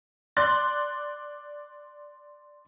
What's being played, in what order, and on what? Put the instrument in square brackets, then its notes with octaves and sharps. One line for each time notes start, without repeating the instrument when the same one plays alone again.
[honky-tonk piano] D5 C6 F#6 A6